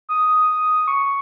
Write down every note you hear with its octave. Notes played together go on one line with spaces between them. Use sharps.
D#6
C#6